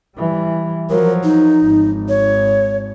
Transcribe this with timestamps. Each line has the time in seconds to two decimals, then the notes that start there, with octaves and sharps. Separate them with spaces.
0.17 E3 G3
0.90 F3 F#3 A#4
1.24 D#4
1.62 G#1
2.09 C#5